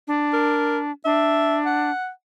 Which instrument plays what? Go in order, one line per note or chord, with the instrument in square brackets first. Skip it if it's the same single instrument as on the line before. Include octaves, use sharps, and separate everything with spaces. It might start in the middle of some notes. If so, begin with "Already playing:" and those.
[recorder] D4
[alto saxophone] A#4
[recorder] D4 [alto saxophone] E5
[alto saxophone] F#5